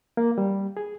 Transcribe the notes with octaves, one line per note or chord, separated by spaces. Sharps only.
A#3
G3
G#4